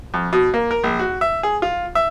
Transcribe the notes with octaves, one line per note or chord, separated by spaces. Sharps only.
F2
B2
A#3
A#4
A#1
F#4
E5
G#4
F4
E5